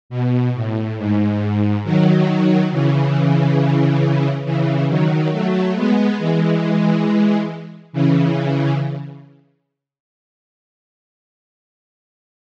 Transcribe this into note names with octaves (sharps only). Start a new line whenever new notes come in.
B2
A2
G#2
D#3 F#3
C#3 E3
C#3 E3
D#3 F#3
F#3 A3
G#3 B3
E3 G#3
C#3 E3